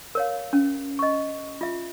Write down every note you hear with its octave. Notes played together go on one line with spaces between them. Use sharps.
A#4 C#5 F5
C#4
D#5 C#6
F4 E5